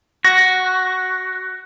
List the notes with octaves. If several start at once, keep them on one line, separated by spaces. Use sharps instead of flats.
F#4 A#6